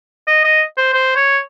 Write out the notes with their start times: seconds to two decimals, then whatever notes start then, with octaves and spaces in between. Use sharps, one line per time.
0.27 D#5
0.44 D#5
0.77 C5
0.94 C5
1.16 C#5